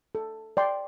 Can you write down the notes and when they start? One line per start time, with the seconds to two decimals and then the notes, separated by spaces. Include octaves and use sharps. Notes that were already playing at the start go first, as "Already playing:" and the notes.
0.15 A4
0.57 D5 G5 C6